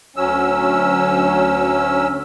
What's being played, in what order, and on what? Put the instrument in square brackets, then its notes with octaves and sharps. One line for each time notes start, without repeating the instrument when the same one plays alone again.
[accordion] D2 F#3 C#4 E6